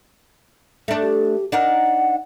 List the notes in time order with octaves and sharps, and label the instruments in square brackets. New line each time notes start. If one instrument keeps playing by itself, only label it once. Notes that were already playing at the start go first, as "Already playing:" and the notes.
[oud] A3 D4
[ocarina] G4
[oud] D4 D#4 A#4 [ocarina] F#5